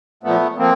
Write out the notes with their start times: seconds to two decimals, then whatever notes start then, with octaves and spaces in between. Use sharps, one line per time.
0.23 A#2 F3 A3 B3
0.58 F3 A#3 C4